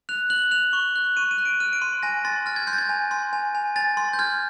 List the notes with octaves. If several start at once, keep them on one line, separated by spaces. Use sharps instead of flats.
F#6 F7
F#6 F#7
F#6 F7
C#6
F#6
C#6 D#7
D#7
F#6
D7
F6 D#7
D7
C6 D#7
G#5 A#6
C6 A6
F6 A6
G#6
C6 G6
A6
G#6
G#5
C6
G#5
G#5
G#5 A6
C6
G6
F6 G#6